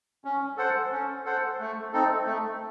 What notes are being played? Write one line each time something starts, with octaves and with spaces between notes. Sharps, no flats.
C#4
A4 C5 F#5
C#4
A4 C5 F#5
A3
C4 D#4 A4
A3